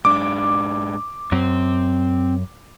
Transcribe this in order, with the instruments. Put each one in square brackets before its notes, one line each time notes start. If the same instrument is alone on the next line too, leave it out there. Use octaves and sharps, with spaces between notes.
[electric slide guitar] G#2 D4 [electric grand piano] D6
[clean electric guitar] F#2 [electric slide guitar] C4